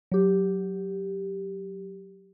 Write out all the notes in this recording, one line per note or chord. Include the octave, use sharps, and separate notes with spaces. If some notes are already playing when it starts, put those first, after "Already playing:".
F#3 G4